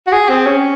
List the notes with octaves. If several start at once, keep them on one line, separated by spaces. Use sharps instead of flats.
F#4
G#4
C4
C#4